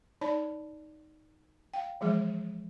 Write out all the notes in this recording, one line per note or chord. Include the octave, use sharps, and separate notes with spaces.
D#4 C#5 D5 A5 B5
F5 G5
E3 F3 G#3 G#4 E5